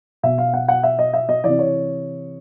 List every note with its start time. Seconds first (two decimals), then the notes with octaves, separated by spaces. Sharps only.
0.23 B2 E5
0.38 F5
0.54 F#5
0.68 F#5
0.83 E5
0.99 D#5
1.13 E5
1.29 D#5
1.44 C3 E3 D5
1.59 C#5